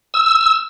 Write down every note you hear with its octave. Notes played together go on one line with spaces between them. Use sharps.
E6